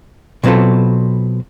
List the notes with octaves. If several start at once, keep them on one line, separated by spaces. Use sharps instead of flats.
B2 F#3 B3 C4 F4 A4